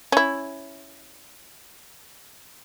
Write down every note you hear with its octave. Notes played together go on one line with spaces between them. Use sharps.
C#4 E4